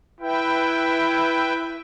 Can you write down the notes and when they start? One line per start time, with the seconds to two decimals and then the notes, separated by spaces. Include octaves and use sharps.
0.21 E4 B4 E5 G5